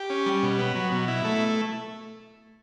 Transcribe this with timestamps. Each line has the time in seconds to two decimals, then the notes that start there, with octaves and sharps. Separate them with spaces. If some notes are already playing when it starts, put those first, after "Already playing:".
Already playing: G4
0.10 C#4
0.26 G3
0.43 B2
0.59 B3
0.75 F#3
0.92 B2
1.08 E4
1.25 A3